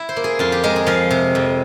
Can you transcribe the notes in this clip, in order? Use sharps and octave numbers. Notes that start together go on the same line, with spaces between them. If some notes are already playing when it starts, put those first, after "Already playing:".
Already playing: E4 E5
C5
A#3
G#4
F2 F4
G4
G#3 A#4
G#4
F3 F5
C3
F2